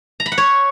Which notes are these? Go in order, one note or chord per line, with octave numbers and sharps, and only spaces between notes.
A#5
B5
F#5
C#5